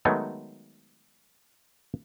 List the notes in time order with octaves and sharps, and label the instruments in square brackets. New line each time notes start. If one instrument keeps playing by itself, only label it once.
[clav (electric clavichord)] D#3 F#3 G#3 A3 B3